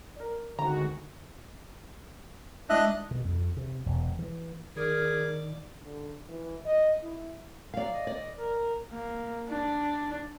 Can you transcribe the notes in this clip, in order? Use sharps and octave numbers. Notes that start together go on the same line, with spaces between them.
A#4 D5
D2 D3 D#3 G#3 C4 F#4 A#5
G#3 D4 E4 D#5 E5 F#6
B2
F2
C3
E1
E3
D#3 G#4 A#4 D5
D3
E3
D#5
E4
F#3 D5 F5
D#5
D5
A#4
A#3
D4